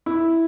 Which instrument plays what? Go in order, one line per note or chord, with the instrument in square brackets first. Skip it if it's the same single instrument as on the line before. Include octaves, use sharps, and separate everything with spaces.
[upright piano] E4